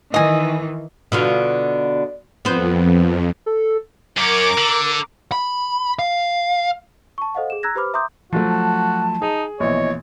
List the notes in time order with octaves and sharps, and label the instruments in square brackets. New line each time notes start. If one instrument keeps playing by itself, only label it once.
[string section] D#3 E3 [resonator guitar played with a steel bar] D#5 G#5
[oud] B2 D3 F4
[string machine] F2 [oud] B3 C5
[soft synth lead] A4
[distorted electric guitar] F#2 C#4 [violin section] A#4 D6
[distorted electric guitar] D3
[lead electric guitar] B5
F5
[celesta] A5 C#6
A4 C5 D#5 F5 F#5
G#4 E7
A#5 E6 F#6 G#6 A#6
G4 B4 C5 B5 D6 F6
E5 A#5 C6 D6 D#6 G6
[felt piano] F3 F#3 A3 [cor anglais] F#4
[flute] A5
[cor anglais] D#4 [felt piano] G#4
[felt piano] A#1 B2 E3 [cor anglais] C#5 [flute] D#5